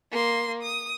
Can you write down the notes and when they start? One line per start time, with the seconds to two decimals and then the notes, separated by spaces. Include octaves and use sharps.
0.11 A#3 C6
0.63 D#6